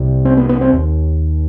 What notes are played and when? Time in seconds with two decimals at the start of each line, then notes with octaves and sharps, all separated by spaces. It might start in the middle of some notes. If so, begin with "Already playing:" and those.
Already playing: C2 C3
0.25 C4
0.37 B3
0.49 B3
0.61 C4
0.73 D#2